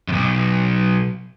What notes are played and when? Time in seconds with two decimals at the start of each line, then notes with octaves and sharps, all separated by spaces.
0.09 B1 F#2